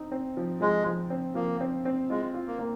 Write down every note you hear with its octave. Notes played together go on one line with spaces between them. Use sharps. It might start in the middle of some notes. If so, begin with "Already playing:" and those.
Already playing: C4 D#4
C4
F3
F3 G#3
F3
C4
F3 A#3
C4
C4
G#3 F4
F4
A#3
A#3